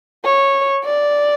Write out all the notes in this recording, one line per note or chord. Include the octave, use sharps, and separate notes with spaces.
C#5
D5